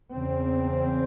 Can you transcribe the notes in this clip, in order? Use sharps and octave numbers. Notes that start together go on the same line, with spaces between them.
E2 C#3 C4